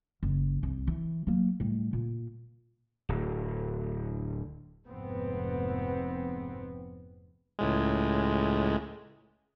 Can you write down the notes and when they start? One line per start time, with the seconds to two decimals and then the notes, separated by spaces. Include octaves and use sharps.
0.23 F#1
0.63 C2
0.87 E3
1.27 F#3 A#3
1.60 A2 G3
1.93 A#2
3.09 D1
4.87 F1 G#2 B3 C4
7.59 C#2 A2 G#3